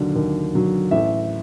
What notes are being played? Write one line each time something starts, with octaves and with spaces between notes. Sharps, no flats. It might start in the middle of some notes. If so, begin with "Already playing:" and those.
Already playing: D#2 D3 F#3
D#2
D3 F#3
A1 E5